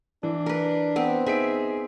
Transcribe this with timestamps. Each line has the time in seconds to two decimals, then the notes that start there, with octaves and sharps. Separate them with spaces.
0.23 E3 D4
0.46 A#4 B4
0.96 B3 C4 B4
1.27 D#4 G#4 E5 B6 D7